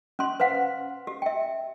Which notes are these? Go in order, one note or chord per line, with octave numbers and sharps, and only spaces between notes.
C#4 C6
B4 C5 F5 F#5
G4
E5 G5